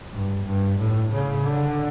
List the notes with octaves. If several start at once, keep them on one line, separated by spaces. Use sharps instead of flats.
G2
G2
A2
C#3
D3